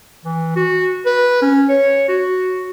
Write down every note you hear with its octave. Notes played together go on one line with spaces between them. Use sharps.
E3
F#4
B4
C#4
C#5
F#4